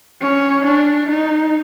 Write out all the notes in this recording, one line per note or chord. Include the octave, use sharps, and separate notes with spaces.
C#4
D4
D#4